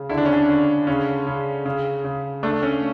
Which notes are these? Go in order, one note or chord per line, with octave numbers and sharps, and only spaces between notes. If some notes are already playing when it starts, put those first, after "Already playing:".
Already playing: C#3
D3 E4
D4
C#4
D4
D3
C#3 C#4
C#3
C#3
C#3
A3 D4
C#4